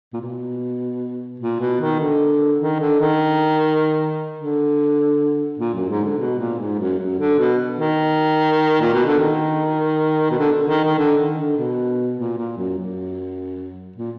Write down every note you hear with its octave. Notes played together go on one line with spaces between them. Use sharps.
A#2
B2
A#2
B2
D#3
D3
D#3
D3
D#3
D3
A#2
F#2
G#2
D3
B2
A#2
G#2
F#2
F#2
D3
B2
D#3
A#2
B2
D3
D#3
B2
D3
D3
D#3
D#3
D3
D#3
D3
B2
A#2
A#2
F#2
F#2
A#2